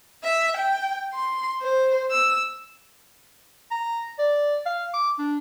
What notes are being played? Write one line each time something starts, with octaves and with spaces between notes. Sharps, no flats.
E5
G5
C6
C5
E6
A#5
D5
F5
D6
D4